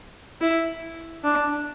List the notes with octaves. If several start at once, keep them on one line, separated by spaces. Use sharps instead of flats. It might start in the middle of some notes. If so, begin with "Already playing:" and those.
E4
D4